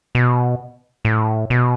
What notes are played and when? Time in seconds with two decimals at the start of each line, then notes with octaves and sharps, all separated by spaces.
0.15 B2
1.05 A2
1.50 B2